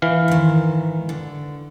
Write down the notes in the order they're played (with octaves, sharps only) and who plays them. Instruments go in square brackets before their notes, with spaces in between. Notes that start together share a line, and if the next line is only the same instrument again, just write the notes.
[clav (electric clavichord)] E3 F5
[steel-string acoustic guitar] G#2 D#3
D3